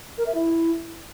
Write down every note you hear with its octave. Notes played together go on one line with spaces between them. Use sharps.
A#4
E5
E4